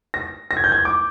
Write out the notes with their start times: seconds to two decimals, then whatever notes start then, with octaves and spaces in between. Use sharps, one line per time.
0.14 A#6
0.51 A#6
0.57 G#6
0.64 G6
0.72 G#6
0.85 D6